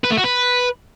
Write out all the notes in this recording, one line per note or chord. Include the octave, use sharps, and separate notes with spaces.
B4
A3
F#4
B4